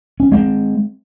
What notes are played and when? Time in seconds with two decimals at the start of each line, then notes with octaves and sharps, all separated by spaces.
0.20 C#4
0.32 G#3 C4